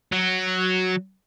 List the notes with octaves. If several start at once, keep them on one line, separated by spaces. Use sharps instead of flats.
F#3